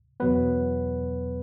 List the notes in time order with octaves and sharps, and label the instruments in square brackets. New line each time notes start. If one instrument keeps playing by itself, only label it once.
[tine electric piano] E2 B2 F#3 B3 B4